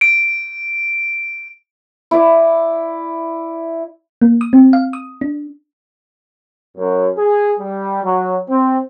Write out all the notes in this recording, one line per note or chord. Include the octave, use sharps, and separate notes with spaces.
D7
E4 D5
A#3
D#6
C4
F5
D#6
D4
F#2
G#4
G3
F#3
C4